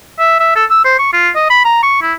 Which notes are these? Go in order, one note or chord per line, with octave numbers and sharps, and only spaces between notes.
E5
E5
A4
E6
C5
C#6
F4
D#5
B5
A#5
C#6
E4